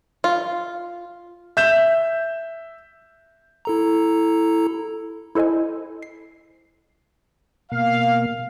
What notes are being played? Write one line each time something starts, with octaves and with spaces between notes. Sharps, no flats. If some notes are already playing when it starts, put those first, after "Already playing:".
F4
E5 G6 E7
E4 A4 A#5
E4 A4 C5 D#5 G#5
C7
B2 A#3 F5